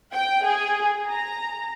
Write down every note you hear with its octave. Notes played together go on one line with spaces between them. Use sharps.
G5
G#4
A#5